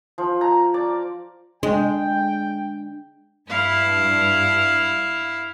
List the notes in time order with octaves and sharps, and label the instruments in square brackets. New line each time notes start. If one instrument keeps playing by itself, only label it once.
[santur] F3
A#5
D5
[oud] G#3 [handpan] D4 [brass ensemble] G5
[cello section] G2 [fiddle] E4 [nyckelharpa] F5